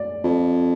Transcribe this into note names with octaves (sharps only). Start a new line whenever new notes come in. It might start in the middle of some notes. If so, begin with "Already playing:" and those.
Already playing: D5
F2